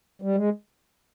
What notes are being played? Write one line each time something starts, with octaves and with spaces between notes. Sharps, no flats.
G3
G#3